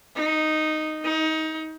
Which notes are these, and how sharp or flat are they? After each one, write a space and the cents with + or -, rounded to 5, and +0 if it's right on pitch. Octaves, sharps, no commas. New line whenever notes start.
D#4 -5
D#4 +25